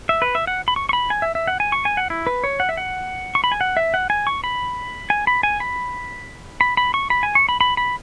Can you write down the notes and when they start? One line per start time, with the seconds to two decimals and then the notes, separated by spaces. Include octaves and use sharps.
0.09 E5
0.22 B4
0.35 E5
0.47 F#5
0.68 B5
0.76 C#6
0.89 C#6
0.93 B5
1.10 G#5
1.22 E5
1.35 E5
1.48 F#5
1.60 G#5
1.72 C#6
1.85 G#5
1.97 F#5
2.10 E4
2.27 B4
2.44 C#5
2.60 F#5
2.69 E5
2.77 F#5
3.35 C#6
3.44 B5
3.52 G#5
3.61 F#5
3.77 E5
3.94 F#5
4.10 G#5
4.27 C#6
4.44 B5
5.10 G#5
5.27 B5
5.43 G#5
5.60 B5
6.61 B5
6.77 B5
6.94 C#6
7.10 B5
7.23 G#5
7.35 C#6
7.49 B5
7.61 B5
7.77 B5